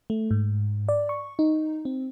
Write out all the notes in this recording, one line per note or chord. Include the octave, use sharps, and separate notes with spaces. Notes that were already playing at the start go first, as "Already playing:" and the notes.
A3
G#2
D5
C#6
D#4
C4